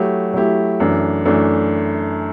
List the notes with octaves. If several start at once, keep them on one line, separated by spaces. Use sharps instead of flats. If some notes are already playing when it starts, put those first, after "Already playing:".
Already playing: F#3 A3 E4 G4
F#3 A3 E4 G4
F#2 E3 A3 D4
F#2 E3 A3 D4